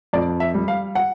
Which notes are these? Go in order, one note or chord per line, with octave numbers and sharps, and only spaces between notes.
F2 D5
E5
G3
F5
F#5